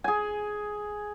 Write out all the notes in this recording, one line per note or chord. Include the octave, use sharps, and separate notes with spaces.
G#4 G#5